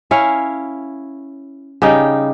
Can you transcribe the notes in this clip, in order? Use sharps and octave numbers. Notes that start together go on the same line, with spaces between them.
C#4 E4 C#5 F5
C#3 G3 D#4 G5